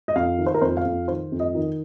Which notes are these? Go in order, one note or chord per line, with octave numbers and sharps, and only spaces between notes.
D#5
F2 F5
D#3
C5
A#4
F2 C5
F5
F2
D#3 C5
F2
D#5
D#3